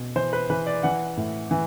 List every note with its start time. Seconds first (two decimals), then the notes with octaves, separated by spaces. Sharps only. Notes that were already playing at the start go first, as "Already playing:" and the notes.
Already playing: B2
0.16 E3 C5
0.33 B4
0.50 E3 B4
0.67 D5
0.83 E3 F#5
1.17 A2
1.51 E3